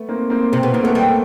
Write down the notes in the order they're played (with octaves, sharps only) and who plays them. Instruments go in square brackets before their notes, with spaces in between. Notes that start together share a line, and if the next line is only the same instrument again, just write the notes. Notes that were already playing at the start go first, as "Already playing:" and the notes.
Already playing: [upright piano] A3 B3
A#3 C4
A#3 C4
[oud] C3 [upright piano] C4
[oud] B2 [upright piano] B3
[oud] C#3 [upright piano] A#3
[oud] F#3 [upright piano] A3 B3
[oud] G3